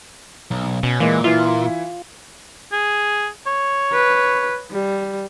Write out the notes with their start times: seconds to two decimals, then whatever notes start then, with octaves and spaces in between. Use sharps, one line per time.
0.51 B1
0.83 B2 C#4
1.00 A#2 E3 G#3 A#3
1.24 E3 E4 F4
2.73 G#4
3.47 C#5
3.93 B4
4.71 G3